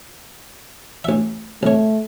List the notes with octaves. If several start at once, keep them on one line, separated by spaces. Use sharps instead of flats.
A1 E5
C2 A3 C#5